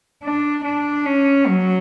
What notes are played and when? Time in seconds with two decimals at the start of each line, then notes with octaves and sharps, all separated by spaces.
0.24 D4
0.64 D4
1.06 C#4
1.47 F#3